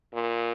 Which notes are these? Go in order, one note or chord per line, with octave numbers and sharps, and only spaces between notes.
A#2